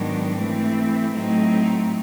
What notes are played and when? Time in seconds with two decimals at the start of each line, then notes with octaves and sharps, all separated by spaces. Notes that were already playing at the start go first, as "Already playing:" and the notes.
Already playing: G#2 D#3 F#3 B3 D4
0.37 E3 A3 C4
1.13 A2 F#3 A3 C4 D#4